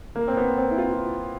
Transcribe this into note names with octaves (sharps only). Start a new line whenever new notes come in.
A#3
C4
B3
C4
E4
F4